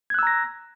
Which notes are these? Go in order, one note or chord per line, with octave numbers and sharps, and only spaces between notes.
A#5 E6 F#6 G#6 A#6